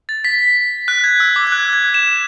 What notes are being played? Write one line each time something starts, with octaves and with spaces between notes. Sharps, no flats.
A6
B6
F#6
G#6
E6
D6
G#6
F#6
G#6
E7